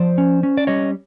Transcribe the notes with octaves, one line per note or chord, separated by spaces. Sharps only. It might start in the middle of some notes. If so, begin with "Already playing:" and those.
Already playing: F3 C5 D5
C#4
C#4
D5
G3 C#5 D#5